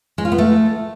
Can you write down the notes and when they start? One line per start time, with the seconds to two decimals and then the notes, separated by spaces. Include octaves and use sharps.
0.18 G#3
0.25 F4
0.32 B3
0.38 A3